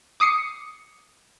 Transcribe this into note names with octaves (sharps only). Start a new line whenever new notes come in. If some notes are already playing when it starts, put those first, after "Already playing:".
D6 D#6 C7 C#7